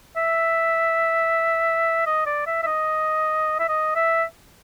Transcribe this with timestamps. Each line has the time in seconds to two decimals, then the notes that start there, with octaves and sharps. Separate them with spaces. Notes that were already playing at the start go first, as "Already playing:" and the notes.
0.17 E5
2.06 D#5
2.26 D5
2.47 E5
2.63 E5
2.67 D#5
3.59 E5
3.69 D#5
3.95 E5